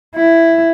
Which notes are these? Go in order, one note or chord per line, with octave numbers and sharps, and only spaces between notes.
E4